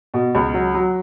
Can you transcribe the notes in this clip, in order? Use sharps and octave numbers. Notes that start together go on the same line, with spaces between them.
B2
C#2
F#3
F#3